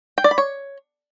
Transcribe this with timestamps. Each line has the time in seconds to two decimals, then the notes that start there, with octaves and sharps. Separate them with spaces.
0.18 G5
0.24 D5
0.31 B5
0.38 C#5